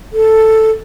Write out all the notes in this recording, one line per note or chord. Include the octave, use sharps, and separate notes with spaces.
A4